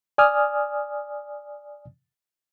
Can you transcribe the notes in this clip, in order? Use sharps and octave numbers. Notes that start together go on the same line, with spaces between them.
D5 G#5 D#6 F6